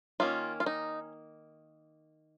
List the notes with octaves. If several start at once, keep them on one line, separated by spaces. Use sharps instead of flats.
D#3 A#3 C#4 F4
F4
D#4